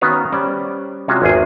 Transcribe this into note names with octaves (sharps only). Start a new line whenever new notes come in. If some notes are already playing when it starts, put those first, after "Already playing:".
D#3 B3 C#4 F#4 B4 F5
G3 C#4 C5 D5
C3 G#3 C#4 F4 F#4
G#1 E2 G#4